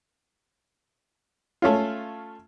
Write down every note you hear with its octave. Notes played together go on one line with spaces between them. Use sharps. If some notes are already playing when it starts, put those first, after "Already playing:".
A3 C#4 F4